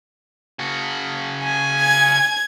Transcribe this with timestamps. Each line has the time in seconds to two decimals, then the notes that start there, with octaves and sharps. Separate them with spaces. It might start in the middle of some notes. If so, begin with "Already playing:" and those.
0.59 C#3 F#4
1.44 G#5
1.81 G#6